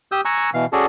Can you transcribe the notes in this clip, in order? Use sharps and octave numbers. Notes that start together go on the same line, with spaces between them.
G4 D#6 E6 G6
G#5 A#5 C#6 E6 F#6
B2 E3 F5
C#4 F#4 G#4 A4 D5 A5